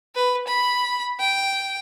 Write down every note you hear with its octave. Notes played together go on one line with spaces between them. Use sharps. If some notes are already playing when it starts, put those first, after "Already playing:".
B4
B5
G5